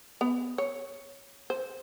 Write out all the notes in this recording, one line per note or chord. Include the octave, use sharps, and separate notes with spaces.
B3
C#5
C5